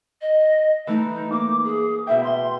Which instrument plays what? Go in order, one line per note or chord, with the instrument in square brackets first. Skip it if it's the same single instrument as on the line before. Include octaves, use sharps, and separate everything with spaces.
[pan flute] D#5
[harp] E3 A3 [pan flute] D#4
[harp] A#3 [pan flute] D6
[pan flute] G#4
[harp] B2 E4 G5 [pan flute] E5
[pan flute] C6